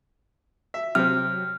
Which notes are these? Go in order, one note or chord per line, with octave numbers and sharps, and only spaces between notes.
E5
C3 F#3 C4 F6